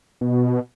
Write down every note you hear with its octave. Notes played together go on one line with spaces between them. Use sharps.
B2